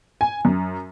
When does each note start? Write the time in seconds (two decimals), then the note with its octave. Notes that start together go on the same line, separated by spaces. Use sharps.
0.21 G#5
0.45 F#2